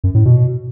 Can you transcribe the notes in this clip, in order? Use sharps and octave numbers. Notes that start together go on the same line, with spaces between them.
F#2
A2
B2